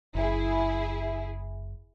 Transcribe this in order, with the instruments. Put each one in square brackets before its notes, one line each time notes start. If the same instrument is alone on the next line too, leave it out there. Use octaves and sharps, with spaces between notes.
[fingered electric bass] F#1 [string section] E4 G#4